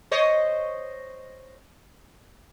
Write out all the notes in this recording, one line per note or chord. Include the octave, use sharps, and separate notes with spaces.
C5 C#5 D#5